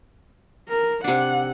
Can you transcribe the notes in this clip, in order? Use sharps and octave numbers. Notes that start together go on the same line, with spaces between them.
A#4
C3 D4 F#5